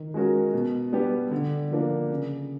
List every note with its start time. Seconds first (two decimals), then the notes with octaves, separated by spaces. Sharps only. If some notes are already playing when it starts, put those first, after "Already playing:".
Already playing: D#3
0.14 G#3 C#4 F#4 A#4
0.53 B2
0.92 G3 B3 D4 G4
1.31 D3
1.71 F3 A#3 D4
2.10 C#3